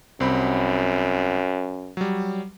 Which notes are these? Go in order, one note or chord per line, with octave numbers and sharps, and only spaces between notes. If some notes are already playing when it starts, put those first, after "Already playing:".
C2 F#2 C4 B5
F#3 G3